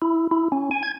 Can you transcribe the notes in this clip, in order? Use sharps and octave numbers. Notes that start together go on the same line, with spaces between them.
E4
E4
C#4
G#5
G#6